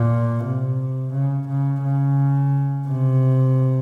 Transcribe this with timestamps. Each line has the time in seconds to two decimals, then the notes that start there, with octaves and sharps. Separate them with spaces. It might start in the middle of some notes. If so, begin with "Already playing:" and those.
Already playing: A#2
0.45 C3
1.14 C#3
1.48 C#3
1.83 C#3
2.87 C3